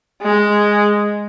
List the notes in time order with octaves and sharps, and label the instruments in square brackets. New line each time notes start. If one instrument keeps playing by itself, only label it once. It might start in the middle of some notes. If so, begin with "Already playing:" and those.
[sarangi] G#3